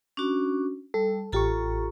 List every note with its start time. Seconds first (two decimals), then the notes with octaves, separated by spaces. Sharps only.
0.17 C#4 D4 F#4
0.94 G3 A4
1.32 A1 F4 G4 A4 A#5 C#6